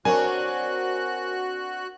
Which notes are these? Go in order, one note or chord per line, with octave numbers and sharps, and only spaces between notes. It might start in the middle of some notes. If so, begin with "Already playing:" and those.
C4 D4 F#4 A#4 C#5 G#5 F#6